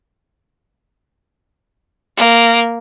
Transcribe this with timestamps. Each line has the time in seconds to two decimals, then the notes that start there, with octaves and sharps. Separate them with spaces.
2.17 A#3